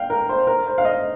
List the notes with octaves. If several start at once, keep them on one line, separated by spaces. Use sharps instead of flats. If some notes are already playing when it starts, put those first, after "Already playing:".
Already playing: F5 G5
A#4
C5
A#4
C5
F5
D#5